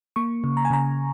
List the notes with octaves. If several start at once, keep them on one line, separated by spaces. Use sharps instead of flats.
A#3 C#6
C#3
A#5
G#5
C#3 A#5